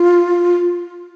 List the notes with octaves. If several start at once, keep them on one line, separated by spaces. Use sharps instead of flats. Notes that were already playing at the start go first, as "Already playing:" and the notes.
Already playing: F4